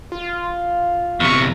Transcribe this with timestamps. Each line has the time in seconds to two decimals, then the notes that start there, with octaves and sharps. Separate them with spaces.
0.12 F4
1.20 E2 C3 C#6